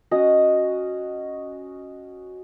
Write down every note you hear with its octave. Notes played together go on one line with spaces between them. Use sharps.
C#4 F#4 D#5